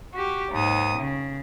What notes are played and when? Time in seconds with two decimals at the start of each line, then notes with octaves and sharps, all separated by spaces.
0.13 F#4 G4
0.51 D#2 G#2 D#6
0.98 C#3